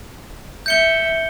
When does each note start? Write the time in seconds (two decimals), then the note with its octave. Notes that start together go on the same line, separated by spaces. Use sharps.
0.66 E5 G6 C#7 G7